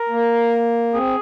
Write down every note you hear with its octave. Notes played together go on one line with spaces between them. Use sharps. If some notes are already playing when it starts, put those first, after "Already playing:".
Already playing: A#4
A#3
C4 G#4